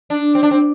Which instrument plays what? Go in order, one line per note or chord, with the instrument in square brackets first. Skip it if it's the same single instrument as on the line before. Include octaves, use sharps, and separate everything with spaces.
[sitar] D4
C4
D4
C4